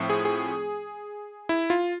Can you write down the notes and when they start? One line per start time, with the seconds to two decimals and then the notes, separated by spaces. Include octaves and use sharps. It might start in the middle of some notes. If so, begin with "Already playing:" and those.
Already playing: A2 F3 A3 C4
0.10 G#4
0.25 G#4
1.49 E4
1.70 F4